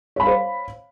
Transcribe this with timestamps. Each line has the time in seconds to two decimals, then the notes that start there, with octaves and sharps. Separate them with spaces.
0.16 C#5
0.20 B5
0.23 F5
0.27 C5